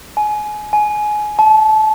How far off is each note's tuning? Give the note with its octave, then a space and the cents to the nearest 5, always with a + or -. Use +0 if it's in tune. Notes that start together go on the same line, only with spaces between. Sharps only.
G#5 +25
G#5 +20
A5 -25